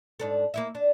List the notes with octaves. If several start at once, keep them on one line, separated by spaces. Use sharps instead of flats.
G#2 D4 A4
A#3 E4 E5
D4